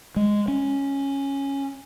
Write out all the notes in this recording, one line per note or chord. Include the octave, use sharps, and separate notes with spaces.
G#3
C#4